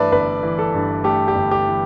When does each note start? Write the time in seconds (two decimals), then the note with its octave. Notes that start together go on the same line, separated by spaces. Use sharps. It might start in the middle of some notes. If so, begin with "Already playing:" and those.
Already playing: G2 E3 A3 B4 D5 E5
0.12 G1 B4
0.43 E3
0.59 A4
0.74 G2
1.04 A3 G4
1.28 G4
1.36 G1
1.51 G4
1.66 E3